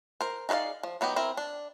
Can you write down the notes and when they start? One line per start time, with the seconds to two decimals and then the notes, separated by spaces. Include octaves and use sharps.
0.21 A#4 C5
0.49 D#4 G#4 B4 D5 F5
0.83 F3
1.01 F#3 B3 D#4 G4
1.16 C4 E4 A#4
1.37 D4